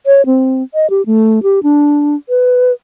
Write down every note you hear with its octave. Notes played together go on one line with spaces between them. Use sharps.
C#5
C4
D#5
G4
A3
G4
D4
B4